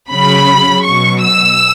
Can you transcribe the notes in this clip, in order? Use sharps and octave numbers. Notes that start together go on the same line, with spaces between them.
C#3 F#3 B5
B2 F#3 C#6
E6